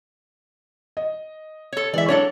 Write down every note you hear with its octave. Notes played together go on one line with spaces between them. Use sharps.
D#5
A4 C#5
E3 G#3 D5 E5
F#3 D4 A4 C#5 A5